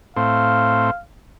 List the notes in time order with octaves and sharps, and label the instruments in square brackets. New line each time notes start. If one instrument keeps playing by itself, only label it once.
[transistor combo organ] A2 C4 [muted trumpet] F5